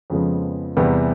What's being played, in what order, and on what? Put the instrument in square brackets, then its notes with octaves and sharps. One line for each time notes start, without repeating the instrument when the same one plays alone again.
[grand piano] F2 C#3 F3 G#3 B3
E2 C3 E3 G3 B3